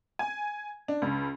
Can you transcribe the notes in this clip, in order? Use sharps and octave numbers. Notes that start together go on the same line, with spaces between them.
G#5
D4
C#2